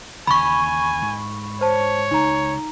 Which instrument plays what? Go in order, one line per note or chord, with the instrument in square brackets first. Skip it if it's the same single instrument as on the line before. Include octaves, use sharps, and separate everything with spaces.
[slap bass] D#2 C#3 E3 [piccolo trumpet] G#5 [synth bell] B5 C#6
[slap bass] G#2
[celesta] C5 A5 [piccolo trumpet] C#5
[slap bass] C#2 [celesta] D#4 A#5